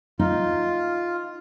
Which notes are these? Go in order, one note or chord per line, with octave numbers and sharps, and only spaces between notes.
D#4 F4